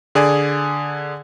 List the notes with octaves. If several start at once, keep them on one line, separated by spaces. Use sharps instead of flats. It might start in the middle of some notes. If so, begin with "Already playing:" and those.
D3 G#4 D5 G#5